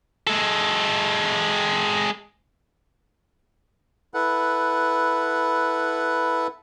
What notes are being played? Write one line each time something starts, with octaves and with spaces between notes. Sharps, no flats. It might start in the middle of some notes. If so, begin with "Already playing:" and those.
G#3 A4
E4 A4 B4 F#5